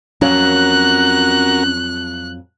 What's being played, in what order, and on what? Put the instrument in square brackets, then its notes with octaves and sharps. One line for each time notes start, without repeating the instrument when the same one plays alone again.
[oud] F2 F#3 A#3 [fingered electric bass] C#4 [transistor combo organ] F#4 A#4 [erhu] F#6